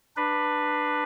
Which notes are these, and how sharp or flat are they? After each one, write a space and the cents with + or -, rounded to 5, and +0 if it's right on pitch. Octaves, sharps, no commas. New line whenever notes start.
D4 +20 B4 +0